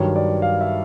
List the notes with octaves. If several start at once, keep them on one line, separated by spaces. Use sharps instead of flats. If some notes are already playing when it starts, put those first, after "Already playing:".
Already playing: G2 D#3 F#3 C#5
D5
F5
E5